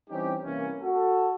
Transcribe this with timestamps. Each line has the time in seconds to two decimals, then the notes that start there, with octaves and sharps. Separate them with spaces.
0.10 E3 G3 C4 C#4 D#4 G4
0.44 C2 E3 A#3 C#4
0.82 F#4 A4